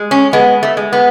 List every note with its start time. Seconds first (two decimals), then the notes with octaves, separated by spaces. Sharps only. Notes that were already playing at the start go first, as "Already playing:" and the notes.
Already playing: G#3
0.11 C#4
0.33 G#3 B3
0.63 A3
0.77 G#3
0.93 B3